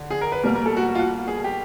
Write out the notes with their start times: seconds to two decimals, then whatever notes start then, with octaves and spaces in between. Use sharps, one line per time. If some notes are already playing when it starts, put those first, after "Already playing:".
Already playing: D3
0.11 G#4
0.21 A#4
0.32 B4
0.43 B2 G3 A#3 A#4
0.55 A#4
0.66 A4
0.77 F#4
0.88 F#4
0.95 F4
0.99 F#4
1.28 G#4
1.44 G4